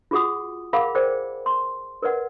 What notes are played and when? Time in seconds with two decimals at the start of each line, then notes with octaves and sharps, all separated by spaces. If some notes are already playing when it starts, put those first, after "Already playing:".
0.11 F4 F#4 G#4 F#5 D#6
0.73 G#4 A#4 F5 F#5 B5 D6
0.95 G#4 A#4 C5 D5 G5
1.46 C6
2.02 A#4 B4 D5 F#5